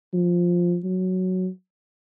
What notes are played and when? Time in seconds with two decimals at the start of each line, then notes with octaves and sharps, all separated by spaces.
0.14 F3
0.85 F#3